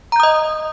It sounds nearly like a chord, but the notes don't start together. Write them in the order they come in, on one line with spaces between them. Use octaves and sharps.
A#5 G6 D#6 D#5